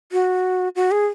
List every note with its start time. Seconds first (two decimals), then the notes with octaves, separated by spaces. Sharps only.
0.12 F#4
0.76 F#4
0.91 G#4